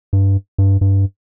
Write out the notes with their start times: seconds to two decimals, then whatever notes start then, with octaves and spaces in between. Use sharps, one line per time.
0.13 G2
0.58 G2
0.81 G2